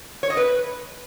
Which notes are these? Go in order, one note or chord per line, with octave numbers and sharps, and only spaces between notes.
C#5
D#5
B4